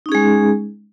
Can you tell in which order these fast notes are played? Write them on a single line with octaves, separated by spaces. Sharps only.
D#4 C#4 G#4 G#3